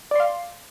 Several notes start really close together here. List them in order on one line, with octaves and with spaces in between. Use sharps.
D5 C6 F5